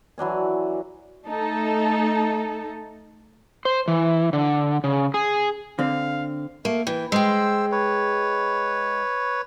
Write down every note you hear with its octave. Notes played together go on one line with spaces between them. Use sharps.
E3 F#3 D4 G#5
A3 D#4 A4
C5
E3
D3
C#3
G#4
D3 C4 F5
A3 A#3
E3 G5
G#3 C5 G5 E6
B4 C#5